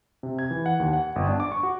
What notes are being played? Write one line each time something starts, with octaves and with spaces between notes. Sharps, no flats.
C3
G#6
E3
F#5
D#2
F#5
G1
D4
D6
C#6
F#4